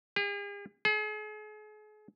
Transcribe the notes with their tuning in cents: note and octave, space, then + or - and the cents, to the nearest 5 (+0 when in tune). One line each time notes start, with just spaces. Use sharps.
G#4 -45
G#4 +40